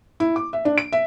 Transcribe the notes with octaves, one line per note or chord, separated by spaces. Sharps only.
E4
D6
E5
D4
D7
E5